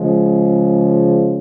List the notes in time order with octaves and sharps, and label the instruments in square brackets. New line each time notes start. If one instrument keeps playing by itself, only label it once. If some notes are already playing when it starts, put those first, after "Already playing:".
Already playing: [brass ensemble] C#3 F3 G#3